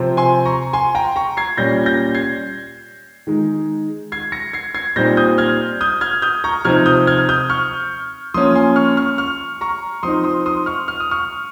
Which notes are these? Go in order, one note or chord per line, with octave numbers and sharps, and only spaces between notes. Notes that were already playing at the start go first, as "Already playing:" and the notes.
Already playing: C3 F3 C4
G#5 C6
A#5 C#6
G#5 C6
G5 A#5
A#5 C#6
G#6 C7
A#2 G3 C#4 G6 A#6
G6 A#6
G#6 C7
D#3 G#3 D#4
G#6 C7
A#6 C#7
G#6 C7
G#6 C7
A#2 G3 C4 D#4 G6 A#6
D#6 G6
F6 G#6
D#6 G6
F6 G#6
D#6 G6
A#5 C#6
C3 F3 C4 D#4 F6 G#6
D#6 G6
F6 G#6
D#6 G6
C#6 F6
F3 A#3 C#4 C6 D#6
G#5 C6
C#6 F6
C#6 F6
C#6 F6
A#5 C#6
F3 C4 D#4 C6 D#6
C6 D#6
C6 D#6
C#6 F6
F6
D#6
C#6 F6